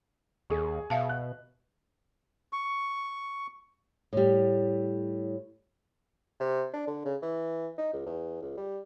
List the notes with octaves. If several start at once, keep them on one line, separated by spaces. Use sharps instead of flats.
D#2 G#4 C#6
B2 E5 F5 A5
F#6
C#6
A2 G3
C3
D4
D3
C#3
E3
D#4
C#2
E2
C#2
G3